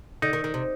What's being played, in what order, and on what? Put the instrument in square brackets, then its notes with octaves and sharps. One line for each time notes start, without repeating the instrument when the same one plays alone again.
[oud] D3 [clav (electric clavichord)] D#4
[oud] D#3
D#3
C3